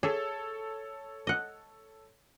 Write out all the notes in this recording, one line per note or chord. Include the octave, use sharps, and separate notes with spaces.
G#4 A4 C#5 E5
D#5 F#5